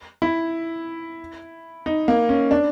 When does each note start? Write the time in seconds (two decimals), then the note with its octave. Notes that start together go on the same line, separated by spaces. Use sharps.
0.22 E4
1.86 D#4
2.08 A#3
2.29 C#4
2.51 D4